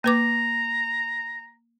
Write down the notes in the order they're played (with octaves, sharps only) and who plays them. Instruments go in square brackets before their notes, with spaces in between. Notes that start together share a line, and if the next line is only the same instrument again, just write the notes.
[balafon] A#3 B4 D6 [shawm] A#5